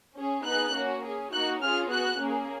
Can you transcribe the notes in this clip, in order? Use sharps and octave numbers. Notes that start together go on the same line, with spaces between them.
C#4 G#4
B3 D#4 G#4 F#6
A#3 C#4 F#4
C#4 G#4
A#3 D#4 F#4 F#6
C#4 F4 G#4 F6
B3 F#4 F#6
A#3 C#4 G#4